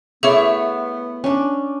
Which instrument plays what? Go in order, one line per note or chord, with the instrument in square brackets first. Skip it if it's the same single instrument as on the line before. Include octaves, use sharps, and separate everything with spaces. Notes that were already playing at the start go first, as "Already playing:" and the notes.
[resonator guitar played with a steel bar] A3 E4 C#5 [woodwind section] B3 [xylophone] G#4 E5
[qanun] C#4 D4